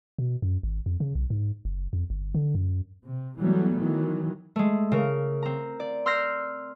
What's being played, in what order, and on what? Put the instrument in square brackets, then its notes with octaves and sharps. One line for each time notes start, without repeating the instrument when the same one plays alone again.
[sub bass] B2
F#2
G#1
F2
C#3
B1
G#2
F#1
F2
G1
D3
F#2
[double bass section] C3
E3 F#3 G3 A3 B3
D#3 E3 F#3
[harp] G#3 A3
C#3 A#4
C4 A#5
D5
C6 E6 F6 G6 A#6 C7